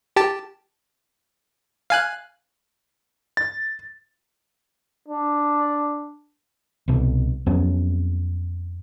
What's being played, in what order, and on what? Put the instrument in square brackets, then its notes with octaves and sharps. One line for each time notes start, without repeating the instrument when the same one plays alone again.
[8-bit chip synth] G4 A5
F5 G#5 F#6
[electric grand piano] A6
[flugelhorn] D4
[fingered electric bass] C2 B2
F2 F#3 B3 C#4